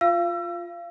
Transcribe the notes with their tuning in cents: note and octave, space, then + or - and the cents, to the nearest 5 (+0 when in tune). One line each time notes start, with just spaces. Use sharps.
F4 +0 F5 -25 E6 +30